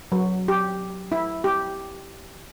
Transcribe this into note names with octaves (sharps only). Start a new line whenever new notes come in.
F#3
G4
E4
G4